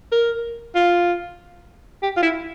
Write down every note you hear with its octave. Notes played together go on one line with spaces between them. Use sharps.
A#4
F4
G4
F4
E4